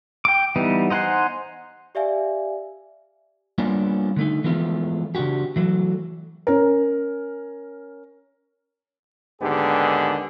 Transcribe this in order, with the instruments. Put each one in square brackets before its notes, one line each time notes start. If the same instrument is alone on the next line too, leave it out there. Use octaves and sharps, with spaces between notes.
[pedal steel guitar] G5 D6
E3 G3 B3 D#4
D#4 C5 F#5 G#5 C6
[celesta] G4 D5 E5 F5 G#5
[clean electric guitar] G3 A#3 B3 C#4 D4 F4
D3 A3 D#4
E3 F3 G#3 A3 B3 F4
C#3 D4 D#4 F#4 G4
E3 F#3 A3
[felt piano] C#4 A#4
[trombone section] D#2 G#2 D3 B3 G4 G#4